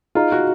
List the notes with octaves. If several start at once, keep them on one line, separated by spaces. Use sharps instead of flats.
D#4 F4 G#4 D#5 A#5
F#4